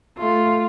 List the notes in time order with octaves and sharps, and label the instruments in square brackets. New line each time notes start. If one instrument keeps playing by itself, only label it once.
[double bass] A3 [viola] F4